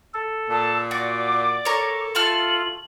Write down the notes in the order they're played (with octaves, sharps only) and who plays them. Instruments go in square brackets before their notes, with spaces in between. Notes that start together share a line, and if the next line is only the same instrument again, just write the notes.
[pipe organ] A4
[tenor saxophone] A#2 [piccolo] A5
[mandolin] F#4 [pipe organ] D5 [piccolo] D6
[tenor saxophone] A4 [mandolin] A#4 C#5
[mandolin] A3 A5 F6 [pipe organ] F4 [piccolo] F#7